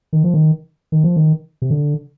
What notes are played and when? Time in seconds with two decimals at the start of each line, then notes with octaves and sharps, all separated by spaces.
0.13 D#3
0.24 F3
0.34 D#3
0.92 D#3
1.04 F3
1.16 D#3
1.62 C3
1.70 D3